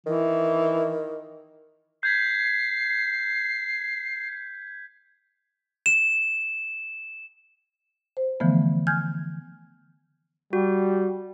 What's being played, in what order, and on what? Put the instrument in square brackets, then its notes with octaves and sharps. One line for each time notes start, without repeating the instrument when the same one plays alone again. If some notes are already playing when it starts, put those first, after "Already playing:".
[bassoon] D#3 [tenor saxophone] E3
[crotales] G6 G#6 B6 [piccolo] C7
[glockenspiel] E7
[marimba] C5
D3 E3 F3 A3 B3
G#5 F6 G6 G#6
[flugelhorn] G3 [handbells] F#4